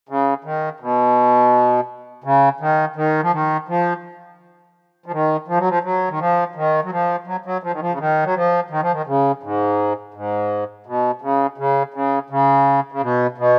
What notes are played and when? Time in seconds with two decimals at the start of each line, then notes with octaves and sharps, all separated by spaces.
0.09 C#3
0.44 D#3
0.80 B2
2.24 C#3
2.60 D#3
2.96 D#3
3.22 F3
3.32 D#3
3.68 F3
5.06 F3
5.12 D#3
5.48 F3
5.58 F#3
5.69 F3
5.84 F#3
6.09 D#3
6.19 F3
6.55 D#3
6.84 F#3
6.91 F3
7.27 F#3
7.46 F#3
7.63 F3
7.72 D#3
7.80 F3
7.90 C#3
7.99 D#3
8.24 F#3
8.35 F3
8.70 D#3
8.81 F3
8.92 D#3
9.07 C#3
9.43 G#2
10.14 G#2
10.86 B2
11.22 C#3
11.58 C#3
11.94 C#3
12.30 C#3
12.92 C#3
13.02 B2
13.38 B2